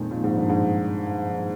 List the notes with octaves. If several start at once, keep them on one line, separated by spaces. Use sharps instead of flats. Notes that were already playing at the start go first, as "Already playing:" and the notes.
Already playing: F2 A#2 D#3 G#3
A#2
G#2
G2
G#2